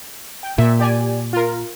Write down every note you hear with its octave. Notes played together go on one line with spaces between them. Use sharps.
G5
A#2 E5
G4 D5 G#5
F4 A#4